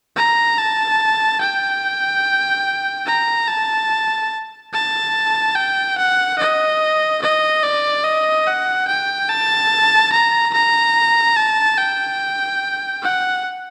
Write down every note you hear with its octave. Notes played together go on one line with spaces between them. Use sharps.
A#5
A5
G5
A#5
A5
A5
G5
F#5
D#5
D#5
D5
D#5
F#5
G5
A5
A#5
A#5
A5
G5
F#5